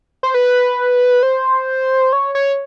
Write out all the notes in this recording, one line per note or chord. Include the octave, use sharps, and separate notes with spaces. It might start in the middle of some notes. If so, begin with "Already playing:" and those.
C5
B4
C5
C#5
C#5